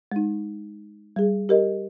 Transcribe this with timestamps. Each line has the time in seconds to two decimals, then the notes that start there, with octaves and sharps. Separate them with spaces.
0.12 G#3 D#4
1.16 G3 G#4
1.49 G4 A#4 D#5